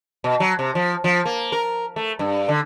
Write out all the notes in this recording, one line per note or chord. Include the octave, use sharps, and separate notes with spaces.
B2
F#3
C3
F3
F3
A#3
A#4
A3
G2
D3